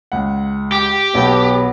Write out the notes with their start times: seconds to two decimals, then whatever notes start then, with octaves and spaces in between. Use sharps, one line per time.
0.12 C#2 F#5
0.72 G4
1.15 B1 B3